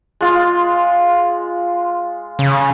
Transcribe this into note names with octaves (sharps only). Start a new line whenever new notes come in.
G#3 F4
C#3